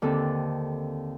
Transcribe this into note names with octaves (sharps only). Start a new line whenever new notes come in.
D#2 D3 C4 A4